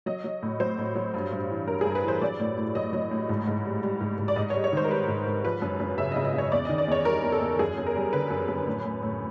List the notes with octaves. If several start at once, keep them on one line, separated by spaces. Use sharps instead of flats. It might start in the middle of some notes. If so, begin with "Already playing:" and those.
F#3 D#5
F#3
A2
F#3 C5
A2
F#3
G2
G2
E3
G2 A#4
G2 G#4
B4
E3 C5
F#3 D5
A2
A2
F#3 D#5
F#3
A2
G#2
G#2
G3
G3
G#2
G#2
D5
G#2 D#5
G3 C#5
C#5
D#3 C5
A#4
G3 B4
G#2
G#2
F3 B4
F#2
F#2
C#3 E5
D#5
C#3
D#5
C#3 C#5
E2 D5
D#3 D#5
D5
E2 C#5
G3 A#4
E2
A4
E2
F#2 G#4
F#2
A#4
G3
D3 B4
F#2
F#2
A2
A2
A2